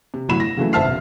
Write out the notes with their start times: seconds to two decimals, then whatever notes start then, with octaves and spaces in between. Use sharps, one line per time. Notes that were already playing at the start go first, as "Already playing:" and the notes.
0.14 C3
0.28 G1 A2 F#3 E4 B5 E7
0.40 A#6
0.57 C#3 E3 F#3 A3
0.73 G#1 C5 E5 A5 F6 C7
0.85 E1